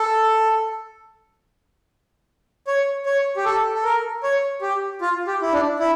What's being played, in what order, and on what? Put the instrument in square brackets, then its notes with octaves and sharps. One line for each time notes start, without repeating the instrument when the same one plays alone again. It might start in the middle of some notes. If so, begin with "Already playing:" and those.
Already playing: [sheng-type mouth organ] A4
C#5
C#5
G4
A4
A4
A#4
C#5
G4
F4
G4
E4
D4
E4